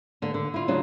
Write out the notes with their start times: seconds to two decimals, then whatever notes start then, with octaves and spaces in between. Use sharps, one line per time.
0.22 D3 A#3
0.34 D3
0.54 E4 F4
0.68 C#3 F#3 D4 F4